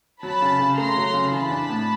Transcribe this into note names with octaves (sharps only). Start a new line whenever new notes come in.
F#3 A5 B5
C#3
C#3
A3 A#5 C6
F#3
C#3
E3 A5 B5
D4
A2